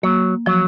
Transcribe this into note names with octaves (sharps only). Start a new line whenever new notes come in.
F#3 A#3
F3 F#3